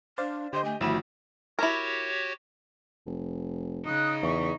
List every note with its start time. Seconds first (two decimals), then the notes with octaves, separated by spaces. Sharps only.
0.18 D4 C5 D5 F5 A6
0.53 D3 G4 C5 D#5 C6 G6
0.65 A3 G#5
0.81 G1 D#3 F3 A3 E4 F#4 B5 E7
1.59 E4 F#4 G4 A#4 C#5
3.06 F1
3.85 C#3 D#4 D#6 F#6
4.22 E2 E5 C#6